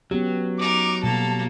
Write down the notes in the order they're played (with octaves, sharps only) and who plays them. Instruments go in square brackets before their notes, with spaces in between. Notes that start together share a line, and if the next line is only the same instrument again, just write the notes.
[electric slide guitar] F#3 [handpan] B3 C#4 G4
[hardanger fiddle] D#4 A#4 [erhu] D6
[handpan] B2 G3 F#4 [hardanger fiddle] A#3 A4 [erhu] A5